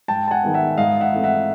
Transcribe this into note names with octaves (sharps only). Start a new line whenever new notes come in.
G#2 G5 A5
A5
F#5 G#5
D#3 G#3 B3
E5 F#5
G#2 D#5 F5
E5 F#5
E3 A3 C4
E5 F#5